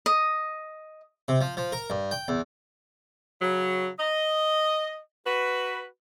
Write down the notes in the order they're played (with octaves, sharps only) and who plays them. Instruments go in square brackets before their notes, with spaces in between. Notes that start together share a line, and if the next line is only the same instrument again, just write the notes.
[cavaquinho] D#5
[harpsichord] C3
F3
F3
A#4
G2
G5
E2
[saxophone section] C#3 F#3
D#5
F#4 B4